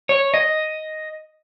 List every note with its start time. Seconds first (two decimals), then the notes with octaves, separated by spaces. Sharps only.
0.09 C#5
0.34 D#5